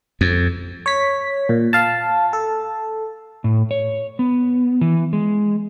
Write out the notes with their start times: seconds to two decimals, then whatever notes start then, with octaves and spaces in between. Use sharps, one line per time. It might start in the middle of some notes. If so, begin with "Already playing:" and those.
0.21 F2
0.86 C#5 B6
1.49 A#2
1.73 F5 A5
2.33 A4
3.44 A2
3.71 C#5
4.19 B3
4.81 E3
5.13 G#3